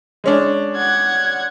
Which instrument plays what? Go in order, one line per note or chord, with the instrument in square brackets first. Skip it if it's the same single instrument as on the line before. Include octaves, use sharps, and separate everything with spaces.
[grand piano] G#3 C#4 D4
[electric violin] F#5 G#6